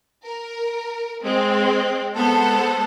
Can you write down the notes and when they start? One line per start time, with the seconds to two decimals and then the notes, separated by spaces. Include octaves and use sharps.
0.24 A#4
1.23 G#3 C4
2.16 G#3 B3 A4 C5 F#5